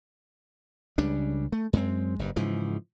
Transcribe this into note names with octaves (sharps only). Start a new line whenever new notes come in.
C#2 C#3 G3 D4
A3
F#2 G#3 A#3 C4
F#1 G2
G#2 C#3 E3 F3